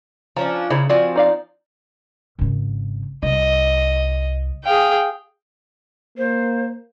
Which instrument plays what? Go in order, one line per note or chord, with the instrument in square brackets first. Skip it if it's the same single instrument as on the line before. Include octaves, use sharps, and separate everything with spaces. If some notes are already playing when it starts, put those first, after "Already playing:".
[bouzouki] F3 C#4 D4 [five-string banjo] A#5
[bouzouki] C#3 [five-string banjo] E4 C5 A#5
[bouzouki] F3 C4 G#5 [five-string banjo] F4 F#4 D5
[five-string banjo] D#4 D5 F5
[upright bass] G#1 C#3
[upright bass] C2 [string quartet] D#5
[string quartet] G#4 F5 G5
[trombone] A#3 [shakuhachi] C5